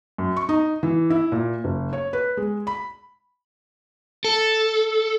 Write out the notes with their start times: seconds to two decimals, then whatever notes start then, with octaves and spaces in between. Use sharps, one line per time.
0.18 F#2
0.36 C#6
0.49 D#4
0.83 E3
1.10 E4
1.32 A#2
1.64 F#1
1.93 C#5
2.13 B4
2.37 G#3
2.67 B5
4.24 A4